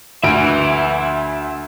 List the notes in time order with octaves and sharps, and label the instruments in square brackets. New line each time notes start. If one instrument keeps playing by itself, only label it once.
[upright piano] D2 D7 [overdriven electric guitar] E5 G#5